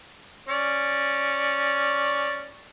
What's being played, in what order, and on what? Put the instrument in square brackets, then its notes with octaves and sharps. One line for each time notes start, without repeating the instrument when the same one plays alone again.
[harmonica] C#4 D5